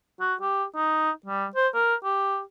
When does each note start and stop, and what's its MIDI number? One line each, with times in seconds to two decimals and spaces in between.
0.20 0.34 66
0.41 0.64 67
0.76 1.11 63
1.26 1.47 55
1.56 1.68 72
1.74 1.94 70
2.04 2.41 67